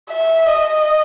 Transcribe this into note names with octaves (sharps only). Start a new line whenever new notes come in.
E5
D#5